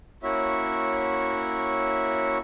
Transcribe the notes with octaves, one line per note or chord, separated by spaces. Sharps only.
A#3 C#4 E4 F#4 C#5 E5